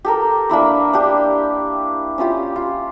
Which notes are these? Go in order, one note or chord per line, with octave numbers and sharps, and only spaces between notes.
G4 A4 A#4
A#3 D4 E4 B5
D4 G4
C#4 E4 F4 G4
F4